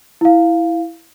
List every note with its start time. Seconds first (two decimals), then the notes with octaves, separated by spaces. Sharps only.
0.21 E4 F5